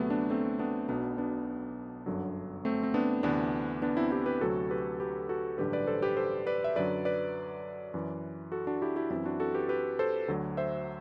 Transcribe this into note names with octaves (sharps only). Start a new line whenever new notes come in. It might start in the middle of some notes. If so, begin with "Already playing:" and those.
Already playing: D2 C3 F#3 A3 B3
B3 D4
A3 C4
B3 D4
B1 B2 F#3 B3 D4
B3 D4
G1 F#2 D3 F#3
A3 C4
C4
B3 D4
D2 C3 E3 B3 D4
B3 D4
C4 E4
E4 G4
G4 B4
D2 C3 F#3 F#4 A4
G4 B4
G4 B4
F#4 A4
A1 G2 D3 F#3 G4 B4
B4 D5
A4 C5
G4 B4
A4 C5
B4 D5
E5
F#2 D3 F#3 B4 D5
B4 D5
F#2 E3
F#4 A4
D4 F#4
E4 G4
E4 G4
F#2 E3 C4 E4
D4 F#4
F#4 A4
G4 B4
G4 B4
A4 C5
D2 D3 F#3
C5 E5